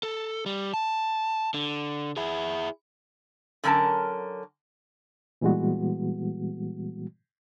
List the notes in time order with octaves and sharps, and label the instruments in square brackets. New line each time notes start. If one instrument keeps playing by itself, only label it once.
[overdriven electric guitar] A4
G3
A5
D3
E4 G#4
[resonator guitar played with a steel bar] D3 F#3 C#4 A#4 A5
[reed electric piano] A#2 E3 G3 G#3 B3 F#4